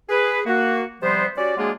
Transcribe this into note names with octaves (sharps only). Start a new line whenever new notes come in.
G#4 B4
A#3 F#4
C3 F3 G3 B3 C5
C#4 F#4 G4 D5
F#3 G#3 A#3 D4 F4 G#4